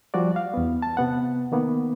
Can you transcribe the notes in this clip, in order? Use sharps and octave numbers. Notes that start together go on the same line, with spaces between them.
F3 G3 F#4 D5
F5
E2 B3
A5
C3 B3 F#5
D#3 A#3 B3